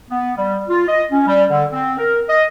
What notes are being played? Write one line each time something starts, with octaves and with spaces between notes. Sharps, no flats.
B3
G3
F4
D#5
C#4
G3
D3
C4
A#4
D#5